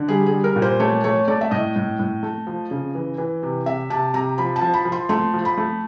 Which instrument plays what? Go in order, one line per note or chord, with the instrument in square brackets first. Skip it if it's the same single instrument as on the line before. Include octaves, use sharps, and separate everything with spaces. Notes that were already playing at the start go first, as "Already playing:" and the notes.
Already playing: [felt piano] D3
G3 G#4
G#4
G3
A#4
A#2
C5
A3 C#5
A3 C#5
A3 D5
E5
A2 D#5
A2
A2
A3
F3
C#3
E3
E3
C3
C3 E5
C3 A5
C3 A#5
F3 B5
A5
F3
B5
F3
C6
A3 C6
F3
B5
A3